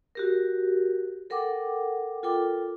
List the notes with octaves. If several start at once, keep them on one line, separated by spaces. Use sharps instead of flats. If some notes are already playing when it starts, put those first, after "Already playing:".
F#4 G4 A#4
A4 A#4 F#5 G5 D6
F4 A4 A#4 G5 D6